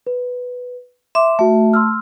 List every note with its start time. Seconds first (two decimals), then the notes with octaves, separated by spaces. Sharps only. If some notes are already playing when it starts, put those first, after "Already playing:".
0.07 B4
1.15 E5 C6 D6
1.39 A3 F#4 E5
1.73 C6 E6 F6